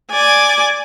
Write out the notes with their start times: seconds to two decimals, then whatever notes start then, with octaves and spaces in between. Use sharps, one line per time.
0.12 D5 G#5